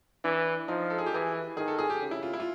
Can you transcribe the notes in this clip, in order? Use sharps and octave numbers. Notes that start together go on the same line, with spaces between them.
E3 D4
F3 D#4
A4
G#4
G4
E3 G#4
D#3 G#4
A4
G#4
G4
C#3
E4
F4
E4
F4